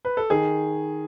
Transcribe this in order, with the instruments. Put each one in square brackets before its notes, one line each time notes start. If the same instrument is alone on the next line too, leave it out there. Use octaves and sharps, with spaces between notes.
[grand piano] B4
A4
D#3 G#4